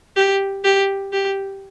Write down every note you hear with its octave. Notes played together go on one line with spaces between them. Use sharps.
G4
G4
G4